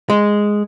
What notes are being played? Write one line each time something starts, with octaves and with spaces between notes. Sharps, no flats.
G#3